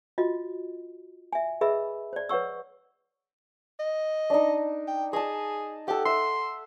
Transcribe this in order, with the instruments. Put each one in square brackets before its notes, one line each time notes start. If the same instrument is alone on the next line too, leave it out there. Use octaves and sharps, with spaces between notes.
[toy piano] F4 F#4 D#5
E5 G#5
G#4 B4 D#5 E5 B5 E6
C5 D5
B4 C#5 F#5 C#6 E6
[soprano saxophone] D#5
[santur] D4 D#4
[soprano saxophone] G5
[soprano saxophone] G#4 [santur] D#5 A5
[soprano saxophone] G4 [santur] A4 F#5
[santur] E5 [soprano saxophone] C6